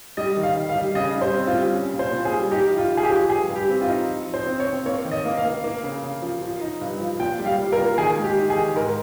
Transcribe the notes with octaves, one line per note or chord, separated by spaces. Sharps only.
G3 D#5
D#3
F5
D#3
F5
G3
C#3 D#5
G3
C5
C4
F4
G3
C#4
A#2
C5
A#2
G#4
G3
D#4 G4
F3
F4
D#4
G#4
G4
F3
G2 G#4
G2
G4
C4
F4
D#4
F3
F3
C5
C4
C#5
C4
A#3 C#5
D#3
D#5
A#3
F5
A#3
A#3
C#3
C#3
F3
F3
D#4
G2
F3
A#2 G5
G3
F5
G3
A#4
A#2
D#3 G#4
G#3
G4
D#4
G#4
D#3
G#2 A#4